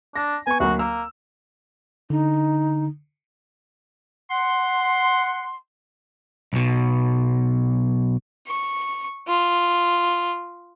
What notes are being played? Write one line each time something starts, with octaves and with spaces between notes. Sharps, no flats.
D4 A#6
B3 G#5 C#6
D2 F#3 A#3 F#4
A#3 E6
D3 D#4
F#5 C6
B1 B2
C#6
F4